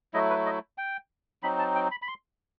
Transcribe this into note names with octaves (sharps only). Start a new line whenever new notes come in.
F#3 A3 E4 D#5
B4
D#5
G5
F#3 C4 D#4 B5
A5
G5
B5
B5
C6